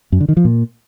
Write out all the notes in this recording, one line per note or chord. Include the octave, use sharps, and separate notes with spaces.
F#2
D3
D#3
F3
A#2